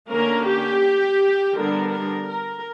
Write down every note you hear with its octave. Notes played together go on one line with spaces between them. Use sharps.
D3 A#3 C#4 A#4
G4
D3 G3 B3 D4 A#4
A#4
A#4